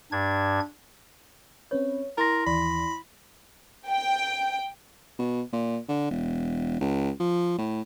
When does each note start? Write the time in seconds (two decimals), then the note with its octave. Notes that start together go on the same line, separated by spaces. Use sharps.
0.12 G2 D4 G#6
1.71 C4 C#4 B4 C#5
2.18 E4 A#4 G#5 C6 A6 A#6
2.47 D#2 E3 D5 B5
3.88 G5
5.19 B2
5.53 A#2
5.89 D3
6.11 E1
6.81 C#2
7.20 F3
7.58 A2